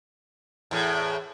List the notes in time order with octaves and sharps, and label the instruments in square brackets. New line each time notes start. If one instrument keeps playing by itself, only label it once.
[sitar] E2 A2